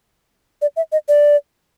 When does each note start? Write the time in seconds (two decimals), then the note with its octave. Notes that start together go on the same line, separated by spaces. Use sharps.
0.62 D5
0.76 E5
0.92 D#5
1.08 D5